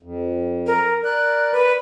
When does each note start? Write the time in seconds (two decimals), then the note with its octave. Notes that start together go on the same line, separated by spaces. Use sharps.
0.03 F2
0.67 A#4
1.04 A#4 D5 F#6
1.52 B4